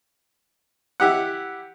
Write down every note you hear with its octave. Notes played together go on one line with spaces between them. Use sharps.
E4 G4 F#5